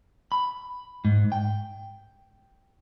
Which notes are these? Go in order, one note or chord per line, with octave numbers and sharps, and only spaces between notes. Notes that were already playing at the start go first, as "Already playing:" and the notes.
B5
G#2
G5